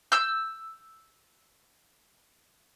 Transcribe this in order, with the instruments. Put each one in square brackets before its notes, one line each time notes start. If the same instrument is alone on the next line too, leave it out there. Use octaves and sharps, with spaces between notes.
[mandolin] E6 G6